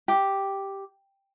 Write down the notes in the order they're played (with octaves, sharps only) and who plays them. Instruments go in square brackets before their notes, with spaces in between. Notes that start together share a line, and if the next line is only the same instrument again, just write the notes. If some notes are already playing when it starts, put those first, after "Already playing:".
[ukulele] G4